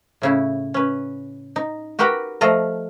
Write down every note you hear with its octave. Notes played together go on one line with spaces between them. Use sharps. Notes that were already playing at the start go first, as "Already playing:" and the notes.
A2 C#3 E4
C#4 B4
D#4
F#4 G4 A#4 B4 F#5 G5
F3 A3 F4 D#5 A#5